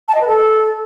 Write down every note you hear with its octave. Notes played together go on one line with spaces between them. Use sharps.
A5
D#5
B4
A4